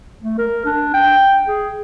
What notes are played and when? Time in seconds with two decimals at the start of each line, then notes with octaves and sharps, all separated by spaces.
0.23 A3
0.38 A#4
0.66 D4
0.94 G5
1.47 G#4